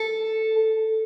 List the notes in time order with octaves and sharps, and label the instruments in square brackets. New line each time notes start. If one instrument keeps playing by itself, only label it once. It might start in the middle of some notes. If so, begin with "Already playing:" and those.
Already playing: [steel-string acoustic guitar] A4